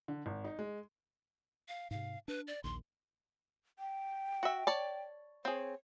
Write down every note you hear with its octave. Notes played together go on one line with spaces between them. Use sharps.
D3
G#1
D#4
G#3
F5
G#2 C3 F5
D4 B4
D5
A#1 D#2 D#3 C6
G5
F#4 E5
C#5 D5 A5
C4 G#4 C#5